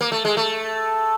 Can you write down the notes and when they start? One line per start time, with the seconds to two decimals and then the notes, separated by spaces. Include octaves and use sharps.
0.01 A#3
0.12 A3
0.25 G#3
0.37 A3